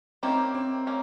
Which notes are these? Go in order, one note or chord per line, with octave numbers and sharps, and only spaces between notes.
D#3 G3 A#3 C4 C#4 E4
C4
A#3 C#4